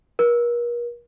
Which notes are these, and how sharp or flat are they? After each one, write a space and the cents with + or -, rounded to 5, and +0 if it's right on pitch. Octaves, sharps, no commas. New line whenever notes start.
A#4 +40